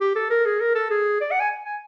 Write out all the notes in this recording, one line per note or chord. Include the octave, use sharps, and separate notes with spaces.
G4
A4
A#4
G#4
A#4
A4
G#4
D5
F#5
G#5
G#5